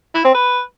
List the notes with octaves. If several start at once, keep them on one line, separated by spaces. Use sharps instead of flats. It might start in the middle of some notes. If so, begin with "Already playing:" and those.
E4
C4
B4